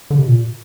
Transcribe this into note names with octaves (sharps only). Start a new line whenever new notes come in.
D3
C3
A#2